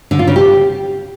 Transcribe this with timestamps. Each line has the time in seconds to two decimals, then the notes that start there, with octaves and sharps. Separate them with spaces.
0.11 D3
0.19 F4
0.27 C#3
0.36 G4